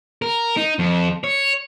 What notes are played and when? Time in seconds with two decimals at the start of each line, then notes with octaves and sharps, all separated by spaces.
0.22 A#4
0.57 D#4
0.79 F2
1.24 C#5